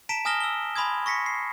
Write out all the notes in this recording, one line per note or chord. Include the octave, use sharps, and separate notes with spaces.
A5 A#5 B6 D7 E7
G#5 D#6 F6 A#6 E7 G7
E6 G7
G#5 B5 C6 D#6 G#6
C#6 A#6 B6 C#7
C7